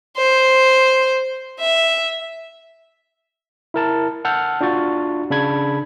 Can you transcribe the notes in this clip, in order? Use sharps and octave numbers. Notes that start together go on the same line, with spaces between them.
C5
E5
E4 A#4 A5
F#5 A5 E6 F6 G6
D4 F4 F#4 C#6 A6
C#3 D4 B5 G#6